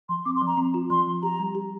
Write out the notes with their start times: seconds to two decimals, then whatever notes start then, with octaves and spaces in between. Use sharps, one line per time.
0.09 F3 C6
0.25 C4 D6
0.36 C6
0.41 F3
0.47 A#5
0.57 C4
0.74 F4
0.90 F3 C6
1.07 F3
1.23 G4 A#5
1.40 G3
1.55 G4